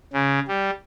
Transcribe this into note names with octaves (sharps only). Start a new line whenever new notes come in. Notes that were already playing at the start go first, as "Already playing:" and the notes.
C#3
G3